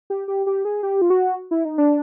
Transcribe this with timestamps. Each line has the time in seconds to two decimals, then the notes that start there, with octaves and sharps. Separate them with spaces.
0.10 G4
0.28 G4
0.46 G4
0.65 G#4
0.83 G4
1.02 F4
1.10 F#4
1.51 E4
1.65 D#4
1.78 D4